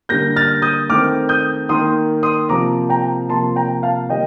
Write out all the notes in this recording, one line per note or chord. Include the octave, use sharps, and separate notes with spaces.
D3 G3 A#3 G6 A#6
F6 A6
D#6 G6
D#3 A3 C4 D6 F6
D#6 G6
D#3 A#3 C6 D#6
C6 D#6
C3 F3 A#3 A#5 D6
G5 A#5
C3 F3 A#3 A5 C6
G5 A#5
F5 A5
D#3 G3 D#5 G5